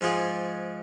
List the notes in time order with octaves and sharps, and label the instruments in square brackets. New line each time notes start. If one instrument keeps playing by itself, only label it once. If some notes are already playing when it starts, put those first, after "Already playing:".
[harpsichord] G#2 F3 G#3 F4 G#4